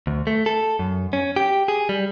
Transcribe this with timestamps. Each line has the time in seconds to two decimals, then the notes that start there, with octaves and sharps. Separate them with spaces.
0.07 D2
0.27 A3
0.46 A4
0.79 F#2
1.13 C#4
1.36 G4
1.68 G#4
1.89 G3